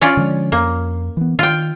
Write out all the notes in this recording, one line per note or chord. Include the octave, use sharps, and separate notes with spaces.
C#4 F4 D5
D3 F3 G#3
F2 A#3
E3 B3
D#3 F4 G5